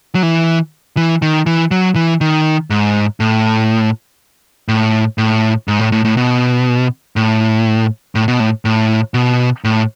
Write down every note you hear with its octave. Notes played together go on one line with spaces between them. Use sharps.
F#3
E3
E3
D#3
E3
F#3
E3
D#3
G#2
A2
A2
A2
G#2
A2
A2
A2
B2
A2
A2
B2
A2
A2
B2
A2